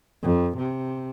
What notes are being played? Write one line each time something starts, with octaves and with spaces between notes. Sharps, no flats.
F2
C3